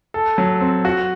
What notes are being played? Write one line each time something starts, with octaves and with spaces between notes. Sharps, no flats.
A4
F#3
C4
F#4